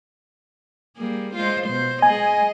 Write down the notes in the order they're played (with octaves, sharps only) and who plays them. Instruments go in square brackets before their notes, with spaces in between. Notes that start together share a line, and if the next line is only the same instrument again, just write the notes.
[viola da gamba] G3 A#3 G#4
G#3 F4 C5
B2 C5
[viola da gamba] G#3 G#4 D#5 [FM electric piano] G#5